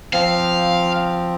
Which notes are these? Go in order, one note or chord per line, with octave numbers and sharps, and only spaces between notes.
F3 C4 F5